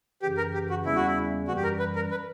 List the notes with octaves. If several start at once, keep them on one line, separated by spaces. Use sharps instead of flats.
F#2 C#3 E3 G4
A#4
G4
F#4
E2 C#3 G3 A#3 C#4 E4
F#4
E4
F#2 E3 G3 F#4
G4
A#4
B4
A#4
B4